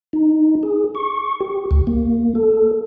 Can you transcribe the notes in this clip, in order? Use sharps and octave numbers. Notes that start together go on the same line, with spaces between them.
D#4
G#4
C#6
G4
D2
A#3
A4